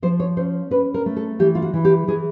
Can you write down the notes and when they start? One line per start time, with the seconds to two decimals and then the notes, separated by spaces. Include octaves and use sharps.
0.02 F3 C5
0.20 C#5
0.37 C#4 C5
0.70 C#4 B4
0.94 A#4
1.06 A3
1.17 A4
1.39 E3 G4
1.55 F4
1.62 F#4
1.74 E3
1.85 G4
2.07 E3 G#4